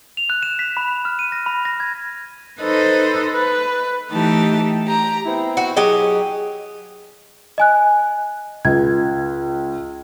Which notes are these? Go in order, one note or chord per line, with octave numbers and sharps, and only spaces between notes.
F7
F#6
E7
B6
B5
F6
D#7
A#6
B5
A#6
G#6
D#4 A4 B4 C5 D#5
B4
E3 A3 D#4 G4 A5
G4 A#5
B3 C4 E4
F#4
F#3 G4 G#4 D#5
D#5 G#5 F#6
C#2 G#6